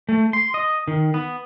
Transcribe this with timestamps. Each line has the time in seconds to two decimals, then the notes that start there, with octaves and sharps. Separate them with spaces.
0.09 A3
0.33 C6
0.54 D#5
0.88 D#3
1.14 B3